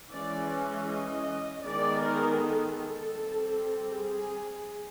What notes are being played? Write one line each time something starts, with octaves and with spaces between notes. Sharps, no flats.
E3 G#3 C#4 D5
D#5
D#3 G#3 B3 D5
A#4
A4
G3 C4
G#4